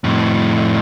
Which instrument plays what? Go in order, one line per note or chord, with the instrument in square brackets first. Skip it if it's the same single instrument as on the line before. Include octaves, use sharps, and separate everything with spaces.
[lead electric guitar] F2 A2